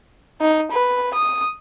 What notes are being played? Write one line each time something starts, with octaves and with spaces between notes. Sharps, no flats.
D#4
B4
D#6